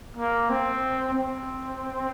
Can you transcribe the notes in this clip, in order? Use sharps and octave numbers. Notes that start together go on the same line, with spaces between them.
A#3
C4
C4